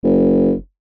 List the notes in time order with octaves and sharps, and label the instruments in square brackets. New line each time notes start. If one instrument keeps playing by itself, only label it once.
[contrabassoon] F#1